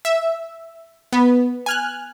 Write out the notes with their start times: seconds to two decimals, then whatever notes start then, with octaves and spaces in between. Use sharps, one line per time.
0.05 E5
1.13 B3
1.66 G#5 F6 F#6